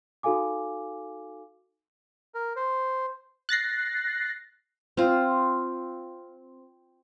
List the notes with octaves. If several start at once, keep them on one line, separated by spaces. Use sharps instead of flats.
D#4 F#4 A4 F5 G#5 D6
A#4
C5
F#6 A6 A#6 C7
C4 F4